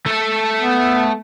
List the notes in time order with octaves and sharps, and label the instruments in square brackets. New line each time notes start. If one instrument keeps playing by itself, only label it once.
[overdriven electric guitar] A3 A4
[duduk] B3